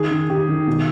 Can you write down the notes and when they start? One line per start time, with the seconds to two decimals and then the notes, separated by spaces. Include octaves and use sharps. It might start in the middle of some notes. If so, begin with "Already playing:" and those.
Already playing: D#3 G#4
0.11 D#3
0.29 D#3 G4
0.49 D#3
0.67 B2